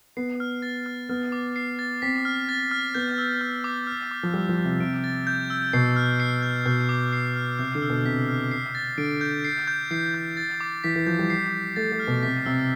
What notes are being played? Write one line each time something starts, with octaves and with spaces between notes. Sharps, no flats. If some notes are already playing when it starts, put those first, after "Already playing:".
B3 C7
F6
A6
F6
B3 F6
D6
C7
A6
C4 B6
F6
A6
F6
B3 G6
E6
F6
D6
F6
D6
F3
G3 F6
F3
D6
C3
C3 D7
A6
G6
E6
B2 C7
F6
C7
G6
B2 G6
D6
C7
F6
C3 G6
D3
E6
B2
C3 B6
F6
C7
A6
D3 D7
G6
C7
G6
E3 C7
G6
A6
D6
E3 B6
E3
F3 G6
G3
C7
A6
A3 A6
A3
F6
B2
C3 B6
C3 E6